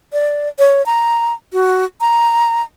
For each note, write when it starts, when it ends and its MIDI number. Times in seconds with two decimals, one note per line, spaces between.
0.13 0.48 74
0.59 0.85 73
0.86 1.33 82
1.53 1.85 66
2.01 2.62 82